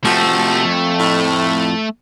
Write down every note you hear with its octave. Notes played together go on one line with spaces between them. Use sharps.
C3 F3 A3 F#4
F2
A2